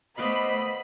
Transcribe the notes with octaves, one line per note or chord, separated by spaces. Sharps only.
A3 B3 C5 D5 D#5 F5 B5